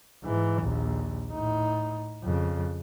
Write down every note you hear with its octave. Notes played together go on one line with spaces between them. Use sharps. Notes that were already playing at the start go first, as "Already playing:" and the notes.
G#2 E3
A#1 D#2
A2 D#4
F2 C#3